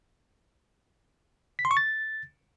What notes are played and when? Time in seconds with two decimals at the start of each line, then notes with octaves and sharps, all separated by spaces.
1.59 B6
1.65 C6
1.71 C#6
1.77 A6